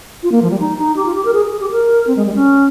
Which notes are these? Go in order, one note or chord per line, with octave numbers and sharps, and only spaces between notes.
F4
A#3
F3
G3
D#4
D#4
G4
F4
G4
A#4
G#4
G#4
G4
A#4
C4
G#3
G3
C#4